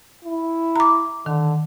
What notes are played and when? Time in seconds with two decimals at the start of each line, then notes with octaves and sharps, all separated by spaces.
0.25 E4
0.76 A#5 D6
1.26 D3 D#3